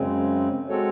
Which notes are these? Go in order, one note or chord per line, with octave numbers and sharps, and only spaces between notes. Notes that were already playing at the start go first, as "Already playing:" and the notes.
Already playing: F#2 C#3 G#3 C4
G#3 C4 F#4 A4 C#5